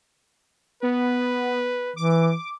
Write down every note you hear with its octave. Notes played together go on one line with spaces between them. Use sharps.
B3 B4
E3 D6